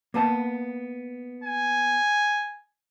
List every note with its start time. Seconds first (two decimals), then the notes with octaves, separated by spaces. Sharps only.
0.14 A#3 B3 A5
1.44 G#5